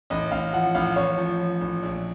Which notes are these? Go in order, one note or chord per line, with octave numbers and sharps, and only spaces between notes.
A1 D#5
A1 F5
F3 F#5
A1 F5
A1 C#5
F3
F3
A1
A#1